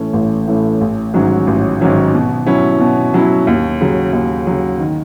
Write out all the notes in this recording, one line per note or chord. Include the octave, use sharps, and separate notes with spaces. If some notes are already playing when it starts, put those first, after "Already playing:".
Already playing: A2 E3 A3 C#4
A1
A2 E3 A3 C#4
A1
G#2 D#3 F#3 C#4
A1
G#2 D#3 F#3 C#4
B2
F#3 C#4 E4
B2
F#3 C#4 E4
D#2
C#3 F#3
D#2
C#3 F#3
D#3